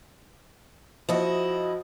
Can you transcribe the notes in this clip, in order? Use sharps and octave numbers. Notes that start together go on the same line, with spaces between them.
F3 E4 F#4 D#5